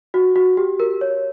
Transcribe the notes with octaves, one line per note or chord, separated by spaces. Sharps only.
F#4
F#4
G4
A#4
C#5